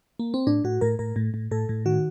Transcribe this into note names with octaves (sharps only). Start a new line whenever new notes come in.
A#3
C4
A2 D4
A2 F#4
A2 A#4
A2 A#4
A2
A2
A2 A4
A2
D#3 F#4